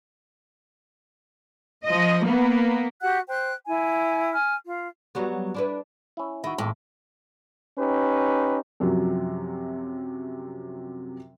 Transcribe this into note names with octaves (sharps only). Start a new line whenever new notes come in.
F3 D#5
A#3 B3
F#4 G4 F#5 F#6
C5 G5 F#6
E4 G#5
G#5 F6
F4
F#3 G3 B3
D4 E4 B4
C#4 E4
D#3 E4 F#4
G#1 E2 A2
C#4 D#4 G4 B4
F#2 C3 F3 F#3